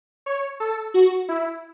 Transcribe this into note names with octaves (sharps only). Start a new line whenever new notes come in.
C#5
A4
F#4
E4